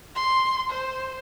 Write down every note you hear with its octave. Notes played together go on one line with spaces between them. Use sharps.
C6
C5